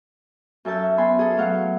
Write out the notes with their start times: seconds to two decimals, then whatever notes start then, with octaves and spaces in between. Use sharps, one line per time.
0.65 F#2 A4 E5 A5 G6
0.98 B3 G#5 B5 C6
1.19 G#4 A4
1.37 F#3 A3 F5 F#5